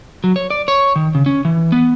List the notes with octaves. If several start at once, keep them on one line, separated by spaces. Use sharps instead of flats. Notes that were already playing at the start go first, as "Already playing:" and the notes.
F#3
C#5
D5
C#5
D#3
C#3
C#4
E3
B3